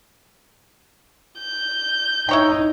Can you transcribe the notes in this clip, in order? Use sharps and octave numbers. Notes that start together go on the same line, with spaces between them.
G6
D#4 E4 C#5 G5